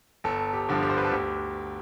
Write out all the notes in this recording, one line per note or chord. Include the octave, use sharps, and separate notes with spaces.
G1 A4
G4
G2 D3 F3
G4
C5
B4
A4
D2 G4